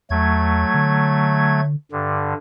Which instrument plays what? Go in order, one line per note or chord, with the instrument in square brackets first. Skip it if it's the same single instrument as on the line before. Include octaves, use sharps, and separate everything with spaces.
[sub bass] E2 [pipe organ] F#3 A3 G#6
[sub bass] D3
[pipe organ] G2 D3